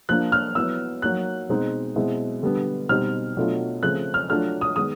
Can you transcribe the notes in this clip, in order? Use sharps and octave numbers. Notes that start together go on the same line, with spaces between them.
F3 A#3 D4 F4 F#6
F6
F#3 B3 E4 E6
F#3 A#3 D#4 F#6
B2 G#3 C4 D#4
B2 G#3 C4 E4
D3 G3 B3 D4
B2 G3 C4 D#4 F6
B2 F#3 A3 D4 F4
C#3 F3 A3 C4 F#6
F6
F#3 A3 D4 F4 F6
D#6
D#3 G#3 B3 D#6